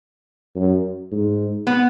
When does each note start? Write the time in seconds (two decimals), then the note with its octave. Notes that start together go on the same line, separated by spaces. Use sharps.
0.56 F#2
1.11 G#2
1.67 B3